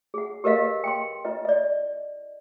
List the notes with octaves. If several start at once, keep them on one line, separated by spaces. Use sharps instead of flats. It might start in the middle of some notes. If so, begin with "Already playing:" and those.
G#4 F#5
G4 A#4 B4 D#5 F5
G5 C6
E4 B4 D#5
D5 D#5